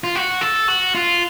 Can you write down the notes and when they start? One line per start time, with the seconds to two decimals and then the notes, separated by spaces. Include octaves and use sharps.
0.04 F4
0.15 F#4
0.41 A4
0.68 F#4
0.95 F4